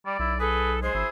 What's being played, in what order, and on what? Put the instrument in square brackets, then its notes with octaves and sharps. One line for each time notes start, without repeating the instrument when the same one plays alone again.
[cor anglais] G3 [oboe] D5
[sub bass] B1 [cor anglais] E4
[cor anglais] G#4 [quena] A4 [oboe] B4
[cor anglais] G#3 [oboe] G#4 [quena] C5
[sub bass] G#1 [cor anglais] E4